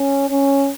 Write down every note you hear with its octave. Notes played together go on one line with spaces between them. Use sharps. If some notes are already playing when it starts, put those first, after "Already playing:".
Already playing: C#4
C#4